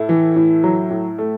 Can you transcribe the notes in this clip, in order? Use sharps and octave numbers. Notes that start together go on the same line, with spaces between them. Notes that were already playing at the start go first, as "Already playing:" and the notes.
Already playing: A2 E4 A4
E3
A2
F#3
A2
A3